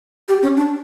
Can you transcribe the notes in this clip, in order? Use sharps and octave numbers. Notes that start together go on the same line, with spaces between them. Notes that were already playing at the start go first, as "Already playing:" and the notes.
G4
C#4
D4